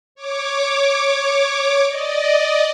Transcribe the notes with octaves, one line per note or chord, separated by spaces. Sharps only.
C#5 D6
D5 D#5